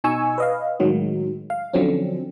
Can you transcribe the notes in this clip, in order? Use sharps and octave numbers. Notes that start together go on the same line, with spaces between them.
B2 D#4 G#5 C#6 E6
B4 D#5 F5
A2 D#3 F#3 G#3
F5
D3 F3 F#3 C4 C#4